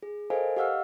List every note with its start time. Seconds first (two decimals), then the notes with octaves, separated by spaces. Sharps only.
0.03 G#4
0.30 A4 A#4 C5 D#5 F5 G#5
0.57 G4 D#5 F5 F#5 E6 F6